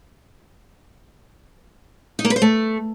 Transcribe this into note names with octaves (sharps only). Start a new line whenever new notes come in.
D#4
A#3
B4
C5
A3